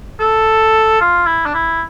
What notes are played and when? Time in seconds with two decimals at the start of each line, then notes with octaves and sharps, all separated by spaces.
0.20 A4
1.01 F4
1.26 E4
1.45 D4
1.54 E4